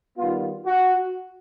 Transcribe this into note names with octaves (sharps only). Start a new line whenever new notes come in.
D#3 G3 B3 F4
F#4